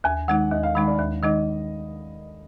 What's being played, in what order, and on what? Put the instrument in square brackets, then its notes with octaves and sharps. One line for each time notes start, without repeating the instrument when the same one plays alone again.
[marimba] D#2 [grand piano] G#5
[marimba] D#3 G#3 D#4 [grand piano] F#5
[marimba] D#2 [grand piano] D#5
[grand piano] F5
[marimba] D#3 G#3 D#4 [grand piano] B5
[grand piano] D5
[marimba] D#2
[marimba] D#3 G#3 D#4 [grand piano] D#5